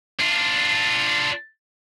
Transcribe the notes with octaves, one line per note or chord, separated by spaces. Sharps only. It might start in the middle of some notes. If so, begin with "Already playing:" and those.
D4 F4